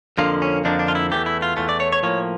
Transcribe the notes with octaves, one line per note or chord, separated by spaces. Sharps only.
F2 D3 F3 A#3 F4
C#4
F2 D3 F3 A#3 D4
D4
F4
E4
E2 E3 A3 G4
E4
F4
E2 E3 A3 F4
D5
C#5
C#5
A2 F3 A#3 C#5